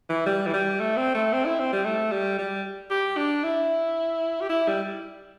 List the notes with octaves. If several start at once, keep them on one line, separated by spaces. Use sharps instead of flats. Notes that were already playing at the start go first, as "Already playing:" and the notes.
E3
G3
E3
G3
A3
C4
A3
C4
E4
C4
G3
A3
G3
G3
G4
D4
E4
G4
E4
G3